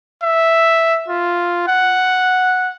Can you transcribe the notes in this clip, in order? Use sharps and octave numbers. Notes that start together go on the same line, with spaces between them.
E5
F4
F#5